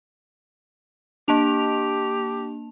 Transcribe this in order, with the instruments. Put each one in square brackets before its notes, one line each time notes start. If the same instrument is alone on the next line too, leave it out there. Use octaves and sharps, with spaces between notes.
[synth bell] A#3 A5 F7 [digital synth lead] D4 [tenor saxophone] G4